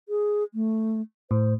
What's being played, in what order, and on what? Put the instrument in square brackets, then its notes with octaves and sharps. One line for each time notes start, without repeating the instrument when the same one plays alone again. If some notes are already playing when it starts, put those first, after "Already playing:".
[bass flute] G#4
A3
[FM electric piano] A2 [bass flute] C5